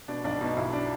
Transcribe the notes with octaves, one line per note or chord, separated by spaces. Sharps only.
B2 D4
B1 D4
B2 D#4
B1 E4
D4